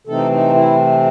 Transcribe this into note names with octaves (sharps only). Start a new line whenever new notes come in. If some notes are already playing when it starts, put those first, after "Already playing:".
C3 E3 A3 C4 D#4 A4
D#4
E4